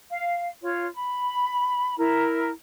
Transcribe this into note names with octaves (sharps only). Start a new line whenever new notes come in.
F5
F4 C#5
B5
E4 A#4